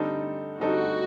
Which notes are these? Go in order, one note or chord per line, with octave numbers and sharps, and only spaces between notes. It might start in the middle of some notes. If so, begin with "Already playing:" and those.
Already playing: D3 G3 C4 D#4 A4
D3 G3 C4 D#4 F#4 A4